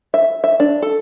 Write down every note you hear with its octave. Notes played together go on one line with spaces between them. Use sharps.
E5
E5
D4
A4